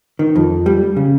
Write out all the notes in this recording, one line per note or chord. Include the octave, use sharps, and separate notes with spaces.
D#3
F2
G3
C#3